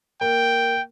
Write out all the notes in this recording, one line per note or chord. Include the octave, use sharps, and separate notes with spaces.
A#3 G5